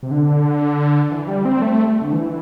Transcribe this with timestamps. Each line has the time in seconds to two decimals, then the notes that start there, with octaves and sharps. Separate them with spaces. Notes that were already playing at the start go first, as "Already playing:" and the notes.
0.03 C3
0.11 D3
1.11 E3
1.28 G3
1.45 C4
1.62 A3
2.02 D3
2.12 E3